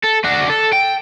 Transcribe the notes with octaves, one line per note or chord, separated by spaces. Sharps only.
A4
D4 F#4
A4
G5